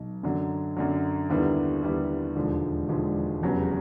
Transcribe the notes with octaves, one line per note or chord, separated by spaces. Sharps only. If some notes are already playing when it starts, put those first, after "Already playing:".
Already playing: B1 B2
F#2 D3 F#3
F#2 D3 F#3
D#2 D3 G3 B3 E4
D#2 D3 G3 B3 E4
E1 D#2 D3 F3 G#3
E1 D#2 D3 F3 G#3
F1 E2 C#3 F#3